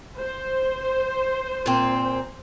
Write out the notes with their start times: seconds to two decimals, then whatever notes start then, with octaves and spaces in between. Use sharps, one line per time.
0.19 C5
1.66 A#2 C4